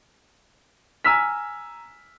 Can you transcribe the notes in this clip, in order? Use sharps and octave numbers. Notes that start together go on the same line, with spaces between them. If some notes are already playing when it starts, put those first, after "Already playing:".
G#5 A#5 E6 F6 B6